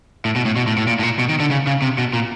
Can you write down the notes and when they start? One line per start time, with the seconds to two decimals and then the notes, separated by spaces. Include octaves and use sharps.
0.25 A2
0.36 B2
0.45 A2
0.56 B2
0.67 A2
0.78 A2
0.87 A#2
0.99 A2
1.03 A#2
1.19 B2
1.29 D#3
1.40 D3
1.51 C#3
1.67 C#3
1.82 C3
1.98 B2
2.13 A#2